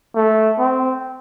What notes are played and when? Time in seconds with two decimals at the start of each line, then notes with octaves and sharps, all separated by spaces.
0.15 A3
0.59 C4